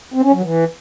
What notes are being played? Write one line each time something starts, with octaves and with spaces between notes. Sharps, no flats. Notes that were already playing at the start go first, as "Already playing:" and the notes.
C4
C#4
F#3
E3